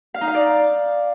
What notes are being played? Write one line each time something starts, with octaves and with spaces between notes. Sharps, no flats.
F5
D#4
F5
D5